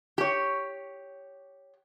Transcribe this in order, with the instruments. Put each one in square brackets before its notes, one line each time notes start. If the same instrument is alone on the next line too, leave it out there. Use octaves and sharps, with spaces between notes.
[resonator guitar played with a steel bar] G4 C#5